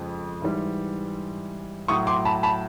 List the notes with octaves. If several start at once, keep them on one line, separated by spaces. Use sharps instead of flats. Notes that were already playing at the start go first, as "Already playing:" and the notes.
Already playing: F2 C#3 F3 G#3
G#2 E3 G3
A2 F#3 C#6 D#6
C6 D6
A5 B5
A5 B5